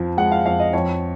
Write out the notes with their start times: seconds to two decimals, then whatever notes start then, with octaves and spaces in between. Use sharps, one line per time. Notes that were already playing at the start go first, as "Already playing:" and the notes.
Already playing: F2 F3
0.17 G#3 F#5
0.32 F5
0.46 F2 F5
0.60 D#5
0.73 F2 C#5